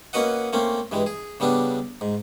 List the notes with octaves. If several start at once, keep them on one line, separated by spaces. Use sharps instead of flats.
A#3 C#4 F#4 B4 D#5 F#5
A3 A#3 C4 C#4
G2 E3 G#3
G#4
C#3 G3 B3 D4
G#2